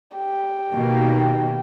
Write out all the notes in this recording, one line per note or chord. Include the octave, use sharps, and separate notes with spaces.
G4
B2 D#3 A#3